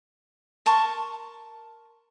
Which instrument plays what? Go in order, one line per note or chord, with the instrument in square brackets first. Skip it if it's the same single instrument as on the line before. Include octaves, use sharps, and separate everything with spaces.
[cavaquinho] A#4 A5 C6 C#6